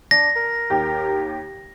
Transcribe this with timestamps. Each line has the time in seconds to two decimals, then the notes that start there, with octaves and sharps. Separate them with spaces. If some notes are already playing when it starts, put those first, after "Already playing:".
0.11 D4 A#6
0.36 A#4
0.70 D#2 G4